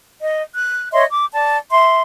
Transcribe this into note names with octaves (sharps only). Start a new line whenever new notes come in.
D#5
F#6
C#5 D#5 E5 C6
D6
D5 A5
E5 C6